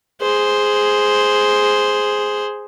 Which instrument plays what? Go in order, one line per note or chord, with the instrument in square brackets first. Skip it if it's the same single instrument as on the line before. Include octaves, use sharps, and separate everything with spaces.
[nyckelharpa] G#4 C5